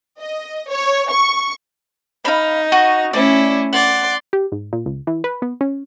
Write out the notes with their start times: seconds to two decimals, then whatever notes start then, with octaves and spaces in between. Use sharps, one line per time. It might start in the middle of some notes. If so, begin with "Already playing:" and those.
0.19 D#5
0.69 C#5
1.10 C#6
2.25 D#4 F5 B5
2.72 F#4 D#5 C#6
3.13 A3 C#4 E4 D5
3.73 D5 F#5 C6
4.33 G4
4.52 G#2
4.73 A#2
4.86 C#2
5.07 E3
5.24 B4
5.42 B3
5.61 C#4